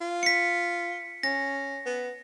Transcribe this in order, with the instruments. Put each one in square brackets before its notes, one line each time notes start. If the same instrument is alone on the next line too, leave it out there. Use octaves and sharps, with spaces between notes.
[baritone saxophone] F4
[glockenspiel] B6 C#7
[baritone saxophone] C#4 [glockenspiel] A#6
[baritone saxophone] B3